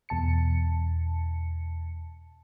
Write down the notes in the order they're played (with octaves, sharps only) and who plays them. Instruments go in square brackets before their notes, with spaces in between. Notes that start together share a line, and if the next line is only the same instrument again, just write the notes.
[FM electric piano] E2 B2 A5 C#7